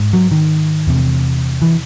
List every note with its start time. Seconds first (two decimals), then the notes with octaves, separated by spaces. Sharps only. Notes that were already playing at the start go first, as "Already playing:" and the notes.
Already playing: G#2
0.13 F#3
0.32 D#3
0.87 E2 C3
1.62 E3